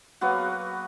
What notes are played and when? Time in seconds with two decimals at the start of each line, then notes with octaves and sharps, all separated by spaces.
0.21 F#3 A#3 B3 F#4